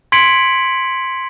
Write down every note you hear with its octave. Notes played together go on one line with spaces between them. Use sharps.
C6 G#6 B6 C#7 D7 F#7